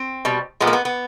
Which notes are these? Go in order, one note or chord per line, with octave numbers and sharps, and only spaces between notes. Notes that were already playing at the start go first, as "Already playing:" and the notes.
Already playing: C4
B2 G3
A#2 F3 G#3 B3
A#3
B3
B3